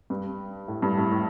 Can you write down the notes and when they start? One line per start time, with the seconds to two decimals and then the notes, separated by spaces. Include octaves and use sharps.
0.10 G2
0.68 A2
0.82 G2
0.97 A2
1.12 A2